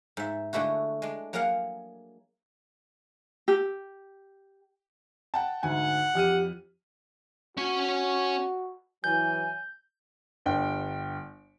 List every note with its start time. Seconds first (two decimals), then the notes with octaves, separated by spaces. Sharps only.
0.17 G#2 E5
0.53 D3 G#3 A3 E4 F#4
1.02 G#3 D4
1.33 F#3 A#3 G#4 A#4 F5 F#5
3.48 G4
5.34 F#5 G5 A5
5.63 D2 G#2 F#5 G#5
6.15 F2 G4 F6 D#7
7.57 C#4 F#4 C#5
9.04 E3 F#3 G#5 G6
10.46 G1 G2 G5